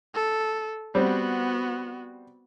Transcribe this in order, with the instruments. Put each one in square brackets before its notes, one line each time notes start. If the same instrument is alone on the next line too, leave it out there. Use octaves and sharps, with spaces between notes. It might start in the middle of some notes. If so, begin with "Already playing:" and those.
[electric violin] A4
[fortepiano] G3 C4 [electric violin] B3 F#4